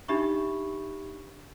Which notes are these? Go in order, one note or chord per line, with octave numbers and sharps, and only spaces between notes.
D4 D#4 G4 E5 B5 C#6